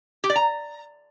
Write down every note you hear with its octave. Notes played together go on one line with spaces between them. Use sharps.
G4
D5
A#5